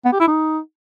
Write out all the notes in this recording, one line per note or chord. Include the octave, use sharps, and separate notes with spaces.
B3
G4
E4
D#4